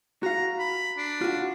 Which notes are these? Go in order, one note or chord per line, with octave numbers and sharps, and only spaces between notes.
F#4 F5 A#5
B5
D4
F4 F#4